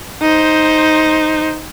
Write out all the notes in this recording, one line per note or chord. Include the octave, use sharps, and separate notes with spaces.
D#4 C5